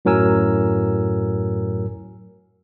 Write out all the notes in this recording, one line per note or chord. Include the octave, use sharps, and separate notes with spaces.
F#2 A2 F#3 A#4 G#5 E6